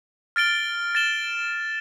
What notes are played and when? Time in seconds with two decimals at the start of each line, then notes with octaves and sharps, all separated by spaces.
0.36 F6 A6 D7 G7
0.95 A6 E7 G7